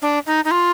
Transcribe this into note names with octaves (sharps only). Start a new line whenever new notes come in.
D4
D#4
D#4
F4